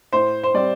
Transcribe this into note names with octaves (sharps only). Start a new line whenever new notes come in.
A2 C5
C5
G3 C4 D5